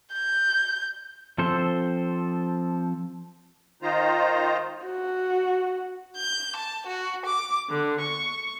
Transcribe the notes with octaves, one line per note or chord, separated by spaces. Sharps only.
G6
F3 C4 A4 C5
D#3 D#4 F4 C5 A#5
F#4
G6
A5
F#4
D6
D3
C#6